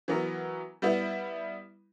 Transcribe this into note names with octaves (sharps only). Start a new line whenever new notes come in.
E3 F#3 B3 A#4
G3 B3 E4